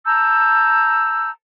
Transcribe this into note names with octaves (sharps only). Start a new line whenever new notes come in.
A5 A#5 E6 G6